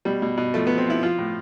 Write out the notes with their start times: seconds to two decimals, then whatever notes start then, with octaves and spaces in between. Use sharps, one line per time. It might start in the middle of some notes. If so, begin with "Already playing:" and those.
0.05 B2 G3
0.22 B2
0.38 B2
0.54 F3 A3
0.67 F3 B3
0.78 C4
0.87 F3 E4
1.03 F3 F4
1.19 A2